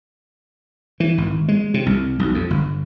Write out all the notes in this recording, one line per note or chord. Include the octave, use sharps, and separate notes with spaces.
E3
G#1
G#3
C3
C2
B1
F2
G1